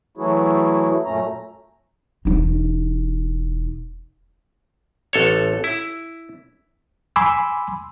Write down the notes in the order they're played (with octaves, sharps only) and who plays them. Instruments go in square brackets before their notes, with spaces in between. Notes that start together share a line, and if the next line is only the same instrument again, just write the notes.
[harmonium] E3 F#3 A3 E4 F#4 G#4
F#2 A#2 A3 C#4 A#5
[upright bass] E1 D#4
[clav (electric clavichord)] A1 A4 C#5
E4
[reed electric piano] G#5 B5 C6 D6 E6